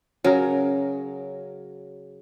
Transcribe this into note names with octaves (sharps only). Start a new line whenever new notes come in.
C#3 F#3 A#4